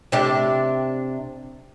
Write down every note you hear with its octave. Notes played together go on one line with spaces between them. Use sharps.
C3 D4 G4